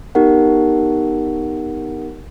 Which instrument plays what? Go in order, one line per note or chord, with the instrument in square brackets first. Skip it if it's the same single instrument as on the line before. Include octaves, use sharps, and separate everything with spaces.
[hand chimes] B3 D#4 G4 A#4 F#5